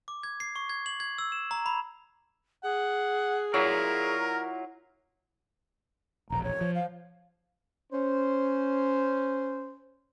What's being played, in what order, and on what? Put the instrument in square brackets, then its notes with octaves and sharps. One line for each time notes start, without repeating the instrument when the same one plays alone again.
[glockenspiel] D6
G#6
C7
C#6
G#6
F#7
G#6
E6
E7
A#5
B5
[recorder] G#4 [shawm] F#5
[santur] F#3 [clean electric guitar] E4 F4 D5 [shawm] A#4
[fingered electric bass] E1 A#1 [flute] A#5
[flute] C#5
[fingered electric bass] F3
[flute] F5
[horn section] C#4 C5